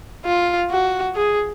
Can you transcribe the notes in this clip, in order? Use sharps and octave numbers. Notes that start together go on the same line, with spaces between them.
F4
F#4
G#4